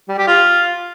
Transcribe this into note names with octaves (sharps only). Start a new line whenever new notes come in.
G3
G4
F4